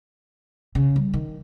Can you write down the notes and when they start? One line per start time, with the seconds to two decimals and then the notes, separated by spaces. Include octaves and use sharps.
0.75 C#3
0.96 G3
1.14 D#3